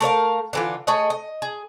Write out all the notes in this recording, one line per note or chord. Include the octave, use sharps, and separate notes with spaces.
A3 A#4 C#5 F5
D3 E3 F4
A3 G#4 C#5 D#5
D#5
G#4